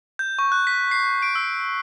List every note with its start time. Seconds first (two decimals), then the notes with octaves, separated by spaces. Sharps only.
0.19 G6
0.39 C#6
0.52 F#6
0.67 B6
0.91 C7
1.22 D7
1.35 E6